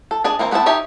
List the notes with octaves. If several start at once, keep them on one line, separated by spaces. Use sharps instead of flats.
A4
D4 G#4 D5 D#5
E3 A#3 C4
A3 B3 C4 E4 A5
D#4 G4 C#5 E5